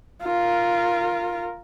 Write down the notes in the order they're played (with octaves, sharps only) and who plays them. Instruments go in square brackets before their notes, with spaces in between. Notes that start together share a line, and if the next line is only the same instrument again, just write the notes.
[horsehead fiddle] F4 A#4